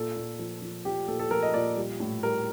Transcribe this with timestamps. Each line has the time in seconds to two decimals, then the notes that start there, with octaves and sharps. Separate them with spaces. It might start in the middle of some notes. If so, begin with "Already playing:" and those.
Already playing: A#2 A4
0.16 A#2
0.39 F3
0.62 F3
0.85 F3 G4
1.08 A#2 A4
1.19 A4
1.31 F3 A#4
1.43 D#5
1.54 A#2 D5
1.77 G3
2.00 A2
2.23 G3 A#4